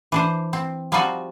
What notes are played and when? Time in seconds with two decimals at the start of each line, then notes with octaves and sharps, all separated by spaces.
0.12 E3 D4 C5
0.53 C4
0.92 F3 G3 C4 D#4 F4 F#4